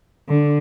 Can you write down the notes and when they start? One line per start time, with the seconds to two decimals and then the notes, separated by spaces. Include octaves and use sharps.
0.29 D3